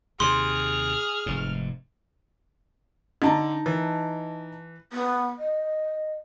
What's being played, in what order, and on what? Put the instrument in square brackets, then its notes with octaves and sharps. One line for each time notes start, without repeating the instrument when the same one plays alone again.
[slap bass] D#2 C3 [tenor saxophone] G#4 [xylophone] C6 [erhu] F6
[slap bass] F1 G#2
[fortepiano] D3 [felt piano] D#4 A5 A#5
[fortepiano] E3
[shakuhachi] B3
D#5